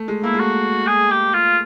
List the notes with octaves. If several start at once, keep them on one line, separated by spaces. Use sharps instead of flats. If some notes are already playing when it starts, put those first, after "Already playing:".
Already playing: A3
G#3
A#3 E4
G#3
A3 F#4
G#4
G4
F4